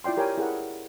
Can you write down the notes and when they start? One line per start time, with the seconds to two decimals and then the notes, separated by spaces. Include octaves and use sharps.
0.04 E4 F4 D5 G5 C6
0.17 G4 A#4 C#5 G5 G#5
0.37 E4 G#4 A#4 F#5